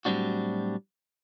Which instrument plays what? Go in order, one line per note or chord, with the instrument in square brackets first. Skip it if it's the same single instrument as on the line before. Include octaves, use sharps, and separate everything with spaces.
[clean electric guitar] A2 F#3 G3 C4 D4 F#4